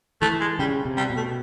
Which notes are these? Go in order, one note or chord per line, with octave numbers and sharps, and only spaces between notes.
E3 A3
G#3
C#3 G3
C3
G3
B2
A3